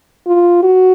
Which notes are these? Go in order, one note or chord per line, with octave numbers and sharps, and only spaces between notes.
F4
F#4